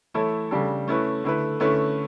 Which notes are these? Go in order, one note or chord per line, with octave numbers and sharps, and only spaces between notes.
E3 A3 E4 A4 C#5
C#3 G3 D4 A4
A3 C#4 E4 B4
D3 A3 E4 B4
D3 A3 C#4 E4 B4